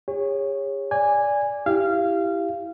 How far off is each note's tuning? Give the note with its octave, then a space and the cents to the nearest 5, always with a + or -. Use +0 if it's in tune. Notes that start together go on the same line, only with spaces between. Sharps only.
G#4 -45 C#5 -5
D5 -10 G#5 -15
E4 +0 G4 +0 F5 -20